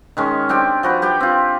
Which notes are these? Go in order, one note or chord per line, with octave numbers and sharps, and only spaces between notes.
D#3 G#3 C#4
C4 D4 G4 G5
F3 F#4 B4
G4 B4 G5
C4 F4